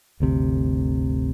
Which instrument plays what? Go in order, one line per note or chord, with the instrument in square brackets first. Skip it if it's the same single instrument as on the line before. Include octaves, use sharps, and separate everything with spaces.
[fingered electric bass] G1 D2 C3